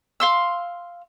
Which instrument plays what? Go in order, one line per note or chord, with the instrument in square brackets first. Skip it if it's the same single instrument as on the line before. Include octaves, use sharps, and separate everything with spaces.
[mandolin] F5 C6 E6